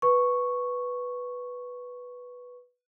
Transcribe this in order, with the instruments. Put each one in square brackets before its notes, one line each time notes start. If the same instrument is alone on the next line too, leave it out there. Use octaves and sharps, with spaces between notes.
[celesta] B4 C#6